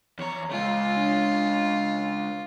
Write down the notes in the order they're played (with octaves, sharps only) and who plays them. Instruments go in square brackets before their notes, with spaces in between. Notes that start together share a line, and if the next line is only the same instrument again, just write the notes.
[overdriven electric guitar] E2 A#5 [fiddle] C#5
[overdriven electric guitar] C#3 G#3 [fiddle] F4
[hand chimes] D4